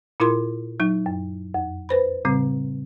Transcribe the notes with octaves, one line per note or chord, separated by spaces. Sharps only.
A#2 E4 F4 A#4 C6
F#3 D#4
F#2
F2
B4 C5 B5
A2 C#3 G3 C4